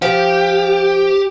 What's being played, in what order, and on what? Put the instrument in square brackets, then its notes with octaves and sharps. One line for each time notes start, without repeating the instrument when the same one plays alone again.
[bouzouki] F3 [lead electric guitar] G4